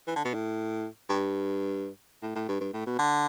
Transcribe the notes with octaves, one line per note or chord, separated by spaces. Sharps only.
E3
D3
B2
A2
G2
A2
A2
G2
G2
A2
B2
D3